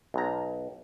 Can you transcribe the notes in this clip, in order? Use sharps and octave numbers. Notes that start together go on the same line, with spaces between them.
B1 A#5